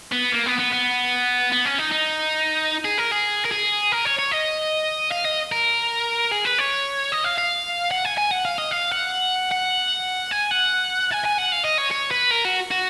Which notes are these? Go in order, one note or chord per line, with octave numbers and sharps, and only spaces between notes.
B3
A#3
B3
B3
B3
B3
C#4
D#4
D#4
G#4
A#4
G#4
A#4
G#4
A#4
C#5
C#5
D#5
F5
D#5
A#4
G#4
B4
C#5
D#5
F5
F5
F#5
G#5
G#5
F#5
F5
D#5
F5
F#5
F#5
G#5
F#5
G#5
G#5
F#5
F5
D#5
C#5
C#5
B4
A#4
F#4
F#4